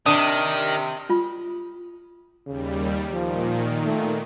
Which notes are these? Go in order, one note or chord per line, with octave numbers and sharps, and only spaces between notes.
C3 D#3 D4 D#6
F4
D#2 C#3 G3
A#2 D#3 F3
A3